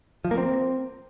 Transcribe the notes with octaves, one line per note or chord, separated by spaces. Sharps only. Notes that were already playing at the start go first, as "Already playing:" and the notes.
F3
A#3
C4